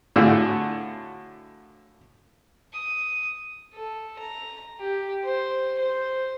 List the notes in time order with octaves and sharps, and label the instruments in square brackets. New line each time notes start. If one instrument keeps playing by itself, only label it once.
[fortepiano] A2 D3 A3 F4 F#4 G#4
[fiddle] D#6
[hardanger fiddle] A4
A#5
G4
C5
C5